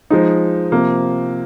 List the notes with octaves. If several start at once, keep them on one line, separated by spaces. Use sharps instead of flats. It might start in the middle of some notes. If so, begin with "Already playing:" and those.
F3 G#3 D#4
C3 F3 A#3